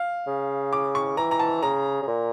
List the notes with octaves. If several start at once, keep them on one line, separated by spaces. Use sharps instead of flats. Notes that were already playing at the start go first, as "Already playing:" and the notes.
Already playing: F5
C#3
D6
C#6
E3 A#5
A#5
A5
C#3 A#5
C#3
A#2